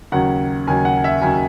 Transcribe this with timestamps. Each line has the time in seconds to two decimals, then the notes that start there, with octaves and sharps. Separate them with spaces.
0.12 D#2 C#3 F#3 F#5
0.67 D#2 C#3 F#3 G#5
0.85 F#5
1.04 E5
1.22 D#2 C#3 F#3 G#5